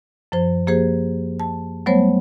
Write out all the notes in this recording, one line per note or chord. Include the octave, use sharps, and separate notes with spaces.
F#2 F3 C5
F3 A#3 G4 G#4 C5
A5
F#3 G3 A3 B3 C5 C#5